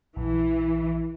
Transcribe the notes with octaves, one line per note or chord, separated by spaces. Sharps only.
A#1 E3